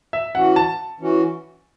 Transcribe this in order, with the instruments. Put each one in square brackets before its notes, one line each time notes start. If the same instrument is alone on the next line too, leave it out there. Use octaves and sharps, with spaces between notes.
[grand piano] E5
[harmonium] E3 C#4 F#4 [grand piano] F#5
[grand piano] A5
[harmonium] E3 C#4 F#4